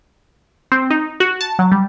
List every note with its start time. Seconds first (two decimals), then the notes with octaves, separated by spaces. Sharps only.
0.72 C4
0.90 D#4
1.20 F#4
1.41 A5
1.59 F#3
1.72 G3